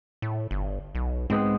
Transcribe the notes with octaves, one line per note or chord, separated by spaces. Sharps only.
A2
G1
B1
G#2 G#3 B3 C4